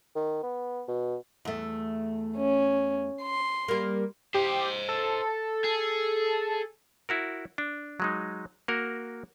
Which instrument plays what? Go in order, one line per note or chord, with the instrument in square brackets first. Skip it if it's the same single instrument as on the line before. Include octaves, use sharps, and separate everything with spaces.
[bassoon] D#3
B3
B2
[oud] E2 A3
[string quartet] C#4
C6
[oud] G3 A#3
[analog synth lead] G4 [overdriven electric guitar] C5 D#5
[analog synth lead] A4
[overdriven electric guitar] G#4
[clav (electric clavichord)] E4 F#4 A#4
D4
F#3 G#3 D#4
A#3 F#4 A#4